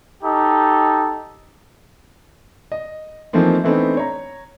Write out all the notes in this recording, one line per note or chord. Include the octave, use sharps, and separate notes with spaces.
D#4 G4 A4
D#5
E3 F3 A3 A#3 C4 D#4
E3 A3 B3 C4 D4 D#4
C#5 A#5